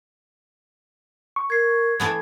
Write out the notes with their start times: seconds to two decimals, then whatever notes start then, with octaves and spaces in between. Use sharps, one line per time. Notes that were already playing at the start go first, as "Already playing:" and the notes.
1.36 C#6
1.50 A#4 G#6 C7
2.00 E3 A3 B3